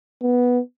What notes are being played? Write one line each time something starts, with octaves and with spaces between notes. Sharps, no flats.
B3